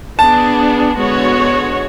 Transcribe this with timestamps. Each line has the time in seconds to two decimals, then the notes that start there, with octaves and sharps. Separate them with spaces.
0.19 B3 D4 G#4 A5
0.98 D3 G#3 B3 F#4 C#5